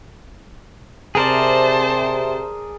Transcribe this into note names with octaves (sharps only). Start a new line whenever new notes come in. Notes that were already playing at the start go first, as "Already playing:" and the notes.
C3 G#4 A#4 C5 D5 A5